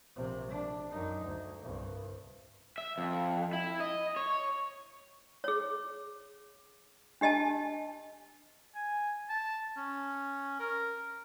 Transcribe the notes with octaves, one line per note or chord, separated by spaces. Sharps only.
A#1 C3
D4
F#2 D#4
D2
C2 G2
E5
F2
E4
D#5
C#5
G#4 C#5
D4 G4 D#5 G#5 A5
G#5
A5
C#4
A#4